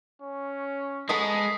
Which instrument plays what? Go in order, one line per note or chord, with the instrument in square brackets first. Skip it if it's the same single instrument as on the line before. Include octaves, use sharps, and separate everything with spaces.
[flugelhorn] C#4
[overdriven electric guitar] G#3 [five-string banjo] B3 A4 A#5 [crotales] D#6 B6 C7